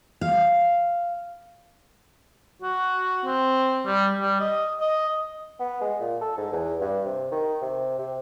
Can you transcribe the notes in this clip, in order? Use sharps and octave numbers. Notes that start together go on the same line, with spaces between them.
F5
F#4
C4
G3
G3
D#5
D#5
B3
G#3
A#2
A4
G#2
E2
G2
C3
D#3
C3
C3